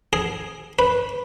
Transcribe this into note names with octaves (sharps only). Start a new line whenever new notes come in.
G#4
B4